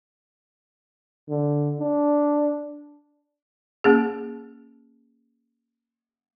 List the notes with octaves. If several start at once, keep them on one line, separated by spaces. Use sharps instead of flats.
D3
D4
A#3 C#4 G#4